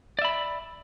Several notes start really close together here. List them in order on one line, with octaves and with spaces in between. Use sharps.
D5 E5 B5